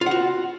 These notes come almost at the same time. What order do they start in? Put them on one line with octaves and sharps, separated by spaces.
F4 F#5 F#4